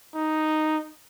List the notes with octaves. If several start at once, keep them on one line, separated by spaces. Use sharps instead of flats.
D#4